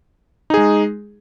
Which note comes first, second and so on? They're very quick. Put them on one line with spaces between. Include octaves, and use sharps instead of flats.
D#4 G#4 G#3